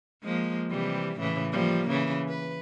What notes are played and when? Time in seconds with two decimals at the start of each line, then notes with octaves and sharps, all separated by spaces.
0.23 F3 G#3 A#3
0.70 C3 E3 G3
1.19 A2 C#3 E3
1.52 F3 G3 A#3
1.89 C#3 E3
2.28 B4